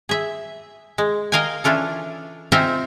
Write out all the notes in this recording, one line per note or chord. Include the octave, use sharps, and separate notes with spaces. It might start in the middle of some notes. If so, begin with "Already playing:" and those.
G#4 E5
G#3
A#4 D#5 F5 G5 G#5
E3 C#4 D4 F4 A4
C4 D#4 F4 C5 E5 G#5